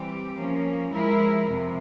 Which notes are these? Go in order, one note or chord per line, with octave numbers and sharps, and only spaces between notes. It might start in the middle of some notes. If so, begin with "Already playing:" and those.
Already playing: E3 G3 C4 G4
F3 A#3 C#4
F3 G#3 E4 A#4
F2 C3 F3